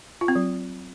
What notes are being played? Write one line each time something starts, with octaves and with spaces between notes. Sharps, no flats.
F4
C4
F#3